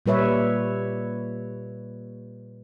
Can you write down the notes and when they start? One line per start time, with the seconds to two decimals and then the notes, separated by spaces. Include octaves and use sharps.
0.06 A#2 G3 B4 C#5 E5